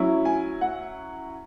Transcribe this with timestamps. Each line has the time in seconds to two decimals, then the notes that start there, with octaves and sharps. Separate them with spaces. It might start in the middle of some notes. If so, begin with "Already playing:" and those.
Already playing: F#3 C#4 E4
0.25 G#5
0.61 F#5